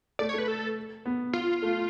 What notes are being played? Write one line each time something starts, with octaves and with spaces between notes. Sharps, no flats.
A3 D5
C#5
A3 B4
A4
B3
F4
A3